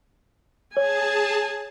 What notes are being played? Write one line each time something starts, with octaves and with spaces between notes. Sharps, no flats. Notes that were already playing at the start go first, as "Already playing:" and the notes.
G#4 C#5 G#5 A5